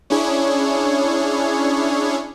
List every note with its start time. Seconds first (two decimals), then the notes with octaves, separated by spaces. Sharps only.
0.10 C#4 D4 E4 G#4 C#5